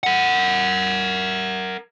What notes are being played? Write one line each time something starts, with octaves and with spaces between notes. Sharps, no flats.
A#4 F#5